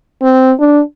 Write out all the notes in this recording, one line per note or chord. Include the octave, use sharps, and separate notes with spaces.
C4
D4